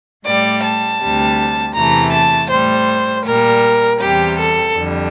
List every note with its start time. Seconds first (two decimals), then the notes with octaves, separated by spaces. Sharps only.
0.25 A2 G3 D5
0.62 A5
1.00 D2 C3 G3
1.74 E2 C3 E3 A3 A#5
2.12 A5
2.50 A2 G3 C5
3.25 A#2 G3 A#4
3.99 E2 C3 G3 G4
4.38 A4
4.75 F2 D3 G3